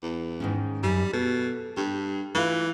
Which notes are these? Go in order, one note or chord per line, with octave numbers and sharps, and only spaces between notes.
E2
G#2 D#3 C#4
F#2 G3
B2 A4
G2 G4
E3 A3 F4